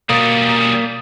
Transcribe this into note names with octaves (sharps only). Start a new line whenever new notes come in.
B2 G3 A#3 C#4 D#6 A6